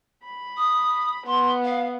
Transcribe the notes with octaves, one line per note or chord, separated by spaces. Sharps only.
B5
D#6
B3 C6
F5